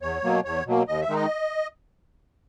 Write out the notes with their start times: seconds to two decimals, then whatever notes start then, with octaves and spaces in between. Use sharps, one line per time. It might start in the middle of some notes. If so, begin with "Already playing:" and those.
0.01 E2 C#5
0.23 B2 F#3 A#3
0.45 E2 C#5
0.66 B2 F#3 A#3
0.87 D#2 D#5
1.01 E5
1.09 D#3 G#3 D#4
1.16 D#5